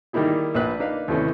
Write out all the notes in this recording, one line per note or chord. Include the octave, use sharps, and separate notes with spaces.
D#3 G3 A#3 D#4 E4 G#4
A#1 A#2 D4 B4 F#6
A#3 D4 D#4 B4 F5
D#2 C3 E3 A3 B3 C#4